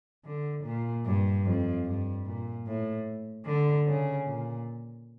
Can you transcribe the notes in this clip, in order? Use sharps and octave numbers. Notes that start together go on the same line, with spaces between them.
D3
A#2
G2
F2
G2
A#2
A2
D3
C#3
A#2